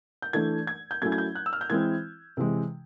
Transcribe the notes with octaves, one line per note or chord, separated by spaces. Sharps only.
G6
E3 A3 D4 G#6
G#6
G6
F#3 A3 C#4 E4 G#6
G#6
G6
F#6
E6
F6
G6
E3 G#3 C4 E4 G#6
C3 E3 G#3